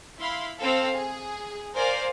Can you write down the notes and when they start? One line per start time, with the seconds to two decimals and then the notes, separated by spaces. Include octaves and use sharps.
0.19 E4 F5 B5 C6
0.60 C4 A4 F5 E6
0.95 G#4
1.75 A#4 C5 D5 F5 G#5